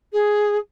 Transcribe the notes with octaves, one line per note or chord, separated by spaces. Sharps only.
G#4